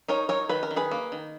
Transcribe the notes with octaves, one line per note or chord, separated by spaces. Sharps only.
D#4 A#4 C#5
D#4 A#4 C#5
D#3 B4
A#4
D#3
G#4 B4
A#3
D#3